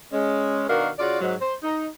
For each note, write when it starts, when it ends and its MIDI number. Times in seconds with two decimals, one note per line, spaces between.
0.12 0.64 56
0.12 0.64 61
0.67 0.88 47
0.67 0.88 51
0.67 0.88 62
0.67 0.88 66
0.67 0.88 70
0.67 0.88 77
0.99 1.17 49
0.99 1.17 65
0.99 1.17 66
0.99 1.17 74
1.21 1.34 44
1.21 1.34 54
1.40 1.54 72
1.63 1.87 63